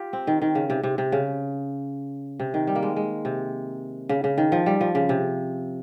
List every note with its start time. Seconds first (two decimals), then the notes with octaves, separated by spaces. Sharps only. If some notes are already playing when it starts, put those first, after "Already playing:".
Already playing: F4 G4
0.13 C4
0.27 D#3
0.42 D#3
0.55 C#3
0.70 C3
0.83 C3
0.98 C3
1.12 C#3
2.40 C3
2.54 D#3
2.67 G3
2.75 A#3
2.82 G#3
2.96 G#3
3.25 C3
4.09 C#3
4.24 C#3
4.38 D#3
4.52 F3
4.66 G3
4.81 F3
4.95 C#3
5.09 C3